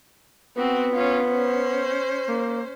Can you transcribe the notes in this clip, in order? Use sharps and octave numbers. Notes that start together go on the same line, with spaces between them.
B3 C4 F#4
C#4 F4
C#4 C5
A#3